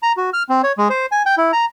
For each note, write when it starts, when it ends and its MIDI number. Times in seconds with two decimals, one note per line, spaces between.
0.03 0.12 82
0.17 0.30 66
0.33 0.43 89
0.49 0.62 60
0.63 0.72 73
0.78 0.88 56
0.90 1.06 72
1.12 1.23 80
1.26 1.35 79
1.38 1.52 64
1.53 1.65 82